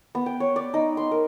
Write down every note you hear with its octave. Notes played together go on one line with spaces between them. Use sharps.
B3
G5
C#5
D5
D#4
C6
A#4